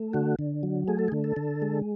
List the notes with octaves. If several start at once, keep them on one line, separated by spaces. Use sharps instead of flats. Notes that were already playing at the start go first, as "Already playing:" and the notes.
Already playing: A3
D3 F#4
D3
F#3
A3 G#4
A4
G#4
D3
A4
D3
G#3